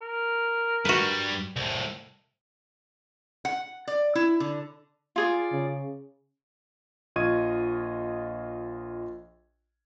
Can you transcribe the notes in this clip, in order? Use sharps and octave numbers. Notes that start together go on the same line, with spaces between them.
A#4
G2 G3 F#4 B4
C2 A2
F#5
D5
E4
D3
F4 G#4 D5
C#3
A#1 F4 D#5 C#6 G#6 D#7